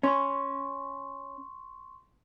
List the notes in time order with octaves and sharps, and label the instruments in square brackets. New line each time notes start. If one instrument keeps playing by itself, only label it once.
[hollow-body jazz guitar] C#4 [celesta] C6 C#6